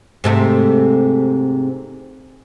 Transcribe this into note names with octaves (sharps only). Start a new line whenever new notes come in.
G#2 C3 A3